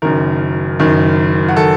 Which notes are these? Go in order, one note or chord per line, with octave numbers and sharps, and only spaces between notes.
F#1 F#2 D#3 A#4
F#1 F#2 D#3
F#4
D#3 A4